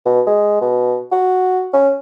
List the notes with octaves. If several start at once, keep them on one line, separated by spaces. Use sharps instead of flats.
B2
G#3
B2
F#4
C#4